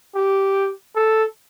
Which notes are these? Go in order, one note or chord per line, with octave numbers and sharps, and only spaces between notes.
G4
A4